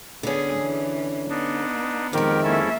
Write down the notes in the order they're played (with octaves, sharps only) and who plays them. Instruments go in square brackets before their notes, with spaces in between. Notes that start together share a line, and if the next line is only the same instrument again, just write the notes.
[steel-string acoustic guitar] D3 C#4 [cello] B3 G#4
[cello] E3
[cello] B3 [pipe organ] D4 D#4
[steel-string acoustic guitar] F2 G#3 [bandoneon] D#3 [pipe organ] G4 A#4
[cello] A#3 E5 [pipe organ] C#4 E4 A4